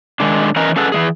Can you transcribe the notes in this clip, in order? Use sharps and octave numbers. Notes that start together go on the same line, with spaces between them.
D#3 G#3 D4
E3 C#4 A#4 B4 D#5 A#5
C#4 G#4 A4 B4 F#5
E3 G#3 G#4